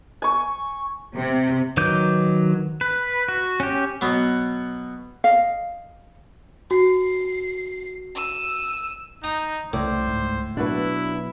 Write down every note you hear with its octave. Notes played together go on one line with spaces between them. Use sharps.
G#5 C#6
C3
D#3 F#3 B4 D6 G6
B4
F#4
C#4 G4
B2 F#3 B3
D#5 F5
F#4 C7
E6 D#7
D#4 G5 A#5 D#6
C2 A2 C#3 E3 C5 D5
C#2 G#2
B2 F#3 D4 E4 F#4 B4